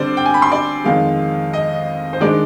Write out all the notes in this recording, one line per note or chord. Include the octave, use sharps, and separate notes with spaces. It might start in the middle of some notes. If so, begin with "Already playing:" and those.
Already playing: D3 G3 C4 C5 D5
G5
G#5
B5
C6
D5
F2 D#3 G#3 F5
D#5
C5
D#3 G#3 D4 D5